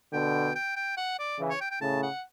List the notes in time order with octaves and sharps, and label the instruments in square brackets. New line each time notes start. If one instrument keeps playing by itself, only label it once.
[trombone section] B2 D3 [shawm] G5
[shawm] G5
G5
F#5
D5
[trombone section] C#3 E3
[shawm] C#5
G5
G5
[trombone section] A2 C#3 [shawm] A5
[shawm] F#5